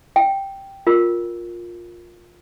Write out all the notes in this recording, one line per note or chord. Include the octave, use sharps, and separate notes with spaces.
G5
F4 A#4